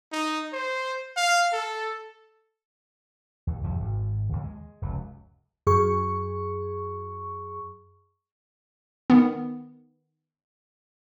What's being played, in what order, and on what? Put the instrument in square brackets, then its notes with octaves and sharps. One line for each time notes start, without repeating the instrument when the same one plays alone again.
[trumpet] D#4
C5
F5
A4
[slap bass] D#2
C2 F2 F3
G#1
D#2 D3
G#3
F1 C#2 F#2
[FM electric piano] F#2 G#4 C#6
[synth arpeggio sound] D#3 B3